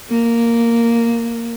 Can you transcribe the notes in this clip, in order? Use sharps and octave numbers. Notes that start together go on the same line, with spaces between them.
A#3